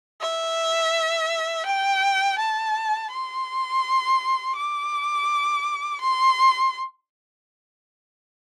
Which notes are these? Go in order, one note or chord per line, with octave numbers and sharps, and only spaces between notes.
E5
G5
A5
C6
D6
C6